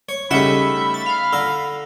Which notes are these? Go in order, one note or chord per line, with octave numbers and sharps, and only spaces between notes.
C#5
C#3 G3 A3 D#4 C#5 E5 F#5 B5
A6
F5
D3 A#5 E6